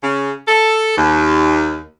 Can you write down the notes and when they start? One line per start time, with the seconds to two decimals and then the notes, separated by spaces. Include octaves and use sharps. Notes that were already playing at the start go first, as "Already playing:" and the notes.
0.03 C#3
0.48 A4
0.97 D#2